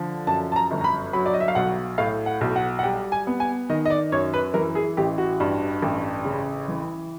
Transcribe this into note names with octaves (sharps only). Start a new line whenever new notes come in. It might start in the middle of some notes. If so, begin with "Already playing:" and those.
Already playing: D3 F3
F#2 A5
A5
A#5
G1
A#5
B5
F#3 B5
D5
D#5
E5
F5
B1 F#5
A2 F5
F#5
B1
F#5
F#5
G3 G5
G#5
B3
G#5
D#3 D#5
D#5
D5
F#2 C#5
B4
E3 A#4
G#4
A1 G4
F#4
G2
A1
C#3
E3